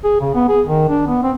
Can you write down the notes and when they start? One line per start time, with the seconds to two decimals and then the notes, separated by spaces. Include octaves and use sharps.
0.04 G#4
0.21 C#3
0.35 B3
0.48 G#4
0.66 D#3
0.89 D4
1.07 B3
1.23 C4